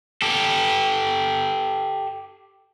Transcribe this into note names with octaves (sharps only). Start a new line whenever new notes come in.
G4 A4